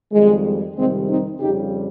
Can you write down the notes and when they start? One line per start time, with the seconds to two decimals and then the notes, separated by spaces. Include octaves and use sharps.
0.13 F2 D#3 G3 G#3
0.76 F2 C3 D#3 G3 G#3 C4
1.08 C4 D#4
1.40 F2 C#3 G3 D#4 G4